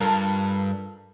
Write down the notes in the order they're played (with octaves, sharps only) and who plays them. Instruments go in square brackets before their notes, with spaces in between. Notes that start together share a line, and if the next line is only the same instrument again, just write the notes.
[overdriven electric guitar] G2 [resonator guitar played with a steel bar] F4 A4 A#4